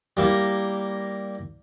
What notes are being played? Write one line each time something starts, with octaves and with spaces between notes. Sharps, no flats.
G3 A#3 E4